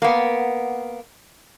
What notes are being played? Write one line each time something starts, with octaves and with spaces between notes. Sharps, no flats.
A#3 B3